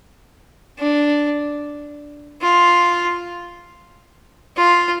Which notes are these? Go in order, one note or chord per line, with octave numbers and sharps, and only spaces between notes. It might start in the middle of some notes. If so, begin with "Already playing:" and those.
D4
F4
F4